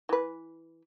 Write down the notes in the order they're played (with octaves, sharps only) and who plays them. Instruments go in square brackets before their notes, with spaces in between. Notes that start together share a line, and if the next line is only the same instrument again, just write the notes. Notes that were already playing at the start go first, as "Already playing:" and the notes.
[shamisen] E3 B4